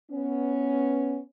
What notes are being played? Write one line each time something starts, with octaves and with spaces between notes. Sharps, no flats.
B3 C#4